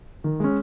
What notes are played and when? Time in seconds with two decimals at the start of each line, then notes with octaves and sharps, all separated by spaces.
0.24 D#3
0.40 G#3 C#4